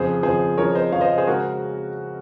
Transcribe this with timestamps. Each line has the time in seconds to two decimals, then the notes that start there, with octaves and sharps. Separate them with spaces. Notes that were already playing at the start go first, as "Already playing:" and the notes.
Already playing: F2 C#3 F3 G#4 C5
0.23 F2 C#3 F3 G#4 C5
0.57 F2 C#3 F3 A#4 C#5
0.75 C5 D#5
0.92 F2 C#3 F3 C#5 F5
1.01 C5 D#5
1.18 G#4 C5
1.27 C#3 G#3 F#4 A#4